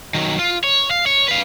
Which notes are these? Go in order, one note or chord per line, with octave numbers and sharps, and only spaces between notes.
D#3 F#3
F4
C#5
F5
C#5
B4 F5